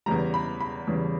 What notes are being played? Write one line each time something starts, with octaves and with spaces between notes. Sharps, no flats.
E2 C#3 E3 G3 A#5
B5
B5
E2 C#3 E3 G3